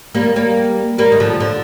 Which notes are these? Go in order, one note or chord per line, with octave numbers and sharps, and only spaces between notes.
G3 A#3
G3 A#3
G3 A#3
D#3
D3 F3
D3